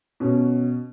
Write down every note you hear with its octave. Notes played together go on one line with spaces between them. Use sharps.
B2 C#4